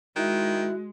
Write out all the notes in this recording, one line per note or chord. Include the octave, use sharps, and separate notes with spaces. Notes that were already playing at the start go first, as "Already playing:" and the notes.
D#3 G#3 E4 F#4